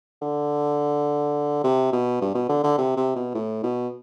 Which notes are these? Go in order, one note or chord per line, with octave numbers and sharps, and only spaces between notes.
D3
C3
B2
G2
B2
D3
D3
C3
C3
B2
A2
B2